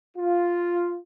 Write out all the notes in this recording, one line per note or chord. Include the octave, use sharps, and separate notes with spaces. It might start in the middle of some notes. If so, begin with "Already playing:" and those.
F4